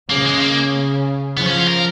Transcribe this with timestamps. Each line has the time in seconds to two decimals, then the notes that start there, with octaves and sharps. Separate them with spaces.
0.10 C#3 A#3
0.26 G#3
0.41 A#3
1.37 F3 B3
1.47 C#4
1.58 F4
1.68 A#4